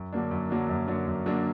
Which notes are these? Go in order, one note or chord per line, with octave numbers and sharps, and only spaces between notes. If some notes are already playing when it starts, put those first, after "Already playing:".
Already playing: F#2
D3 F#3 A#3 D4
F#2
D3 F#3 A#3 D4
F#2
D3 F#3 A#3 D4
F#2
D3 F#3 A#3 D4